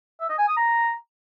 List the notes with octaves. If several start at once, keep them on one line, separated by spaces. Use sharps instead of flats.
E5
D#5
G#5
D#6
A#5